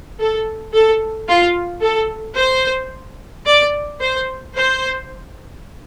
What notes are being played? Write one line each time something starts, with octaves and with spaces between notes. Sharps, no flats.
A4
A4
F4
A4
C5
D5
C5
C5